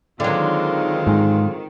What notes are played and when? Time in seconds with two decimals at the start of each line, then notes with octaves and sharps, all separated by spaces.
0.20 D3 D#3 F#3 G#3 C4 F4
1.07 G#2